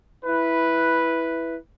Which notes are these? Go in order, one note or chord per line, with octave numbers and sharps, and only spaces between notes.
E4 B4